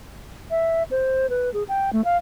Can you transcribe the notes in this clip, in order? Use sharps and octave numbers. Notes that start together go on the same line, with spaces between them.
E5
C5
B4
G#4
G5
A3
F5